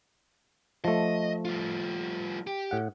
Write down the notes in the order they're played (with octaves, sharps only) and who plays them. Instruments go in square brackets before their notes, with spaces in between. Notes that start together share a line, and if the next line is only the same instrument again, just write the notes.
[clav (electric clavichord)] F3 A3 [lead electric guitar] D#5
[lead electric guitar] G3 F4
G4
[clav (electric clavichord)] A2 F#5